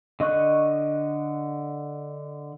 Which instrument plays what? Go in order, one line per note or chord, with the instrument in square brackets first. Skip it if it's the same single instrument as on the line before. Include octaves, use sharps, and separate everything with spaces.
[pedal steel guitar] D3 D#5 C#6 F#6